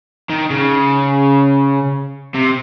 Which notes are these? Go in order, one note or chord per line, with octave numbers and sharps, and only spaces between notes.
D#3
C#3
C3